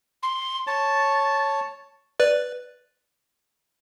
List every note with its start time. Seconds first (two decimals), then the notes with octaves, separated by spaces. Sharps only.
0.23 C6
0.67 C#5 A5 A6
2.20 B4 D5